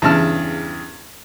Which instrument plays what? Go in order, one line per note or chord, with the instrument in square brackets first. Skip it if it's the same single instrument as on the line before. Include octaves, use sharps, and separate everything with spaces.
[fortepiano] E2 G2 C#3 A5 F6